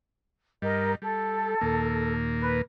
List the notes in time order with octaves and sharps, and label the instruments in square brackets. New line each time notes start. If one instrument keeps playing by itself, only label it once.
[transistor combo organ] G2 G3 [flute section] A#4 D#5
[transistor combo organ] G3 [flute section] A4
[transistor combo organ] D#2 A#2 A#3
[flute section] B4